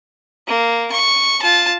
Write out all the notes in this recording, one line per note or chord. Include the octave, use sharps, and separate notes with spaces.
A#3
C#6
F4 A5